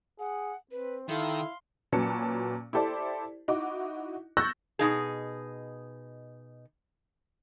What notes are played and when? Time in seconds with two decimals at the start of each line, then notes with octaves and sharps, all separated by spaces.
0.20 G#4 F#5
0.71 C4 B4
1.09 D#3 E4 A4 F5 C6
1.92 A#2 F#3 C#4 B4 A5 C#7
2.73 E4 G4 A4 C5 D5
3.48 D#4 E4 F#4 D6
4.37 C#6 E6 F#6 G6 A6 A#6
4.79 B2 D#4 G#4